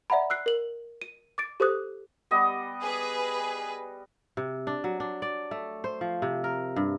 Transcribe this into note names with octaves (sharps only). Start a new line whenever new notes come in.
D5 E5 F#5 A#5 B5
E6 F#6 C7
A#4 F#7
D#7
D6 A6 D7
G4 A4 C5 D6 D#6 F#6
G3 B3 D#5
G#4 B4
C3
D4
F#3
D4
D5
A3
C5
F3
C3
A#4
G2